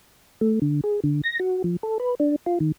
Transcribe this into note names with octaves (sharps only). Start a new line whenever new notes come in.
A3
D3
G#4
D3
A#6
F#4
F3
A4
B4
D4
F4
D#3